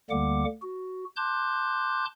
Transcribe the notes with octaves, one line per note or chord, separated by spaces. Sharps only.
D2 D3 G3 A#3 F#5 D6
F#4
A5 C6 D6 F#6 G6